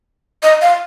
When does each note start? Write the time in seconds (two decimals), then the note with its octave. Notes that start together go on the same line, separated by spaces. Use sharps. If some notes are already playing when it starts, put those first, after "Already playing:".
0.43 D#5
0.61 F5